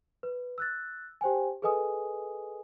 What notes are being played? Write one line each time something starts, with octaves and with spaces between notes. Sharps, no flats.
B4
E6 F#6 A6
G4 C5 G5 G#5
G#4 A4 B4 D#5 G#5 D#6